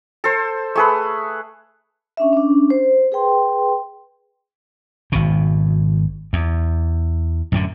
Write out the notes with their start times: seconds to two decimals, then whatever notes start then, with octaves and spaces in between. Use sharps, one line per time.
0.24 A4 C5
0.76 A3 G#4 B4
2.17 C#4 D4 E5
2.33 C#4 D4
2.70 C5
3.12 G#4 B4 G5 C6
5.12 G#1 B2
6.33 E2
7.52 F#2 A2 D3